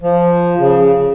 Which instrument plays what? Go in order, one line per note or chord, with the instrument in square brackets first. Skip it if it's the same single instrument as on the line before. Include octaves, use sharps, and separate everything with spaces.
[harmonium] F3
C#3